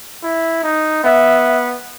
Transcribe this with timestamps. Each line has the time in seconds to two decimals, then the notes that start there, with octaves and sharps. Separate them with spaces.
0.23 E4
0.63 D#4
1.03 B3 E5